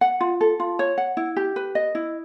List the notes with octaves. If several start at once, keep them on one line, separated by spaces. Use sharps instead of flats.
F#5
F4
A4
F4
C#5
F#5
E4
G4
B4
D#5
E4